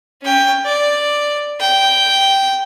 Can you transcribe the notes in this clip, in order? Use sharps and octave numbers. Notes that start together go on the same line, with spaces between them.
C#4 G5
D5
G5